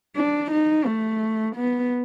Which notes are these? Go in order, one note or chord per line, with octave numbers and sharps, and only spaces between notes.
D4
D#4
A3
B3